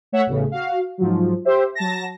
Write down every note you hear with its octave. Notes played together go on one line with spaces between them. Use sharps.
A3 C#5 E5 F#5
A1 E2 A2 C#3
F#4 F5
G#2 F3 F#3
G4 C5 E5
F#3 A5 A#6